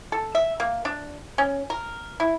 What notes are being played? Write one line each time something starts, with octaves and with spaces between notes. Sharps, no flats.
A4
E5
A#3
D4
C#4
A#4
E4